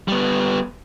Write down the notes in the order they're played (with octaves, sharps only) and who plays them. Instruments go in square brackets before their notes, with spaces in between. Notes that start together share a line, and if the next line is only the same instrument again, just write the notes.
[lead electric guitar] G3 B3